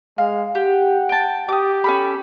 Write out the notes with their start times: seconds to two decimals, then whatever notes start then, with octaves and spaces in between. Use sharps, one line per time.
0.18 G#3 F5
0.55 G4 F#5
1.09 G5 A5
1.48 G4 D6 D#6
1.84 C#4 A4 B5